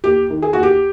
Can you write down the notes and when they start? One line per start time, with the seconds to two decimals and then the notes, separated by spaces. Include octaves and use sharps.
0.04 D#2 G4
0.30 D#3
0.42 G#4
0.53 D#2 F#4
0.63 G4